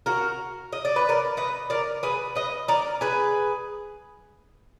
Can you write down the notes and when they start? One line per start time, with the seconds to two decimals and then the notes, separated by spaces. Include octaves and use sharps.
0.06 F#4 A#4
0.73 D#5
0.85 D5
0.96 B4
1.09 A#4 D5
1.37 B4 D#5
1.70 A#4 D5
2.03 G#4 B4
2.35 B4 D#5
2.68 A#4 D5
3.01 G#4 B4